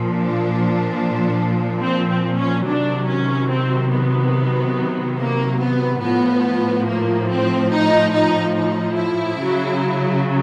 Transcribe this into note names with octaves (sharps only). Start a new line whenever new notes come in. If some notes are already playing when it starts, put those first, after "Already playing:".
Already playing: A#2 F3
D4
C4
C4
C#4
C3 D#3 F#3 D4
C#4
C4
B3
A#3
B3
A2 F3 B3
A#3
C4
D#4
D#4
D#4
E4
C#3 F#3